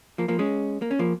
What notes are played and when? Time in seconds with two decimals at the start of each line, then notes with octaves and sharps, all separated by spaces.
0.18 F3 A#3
0.28 F3 A#3
0.39 G#3 C#4
0.82 A#3
0.91 C#4
0.99 F3 A#3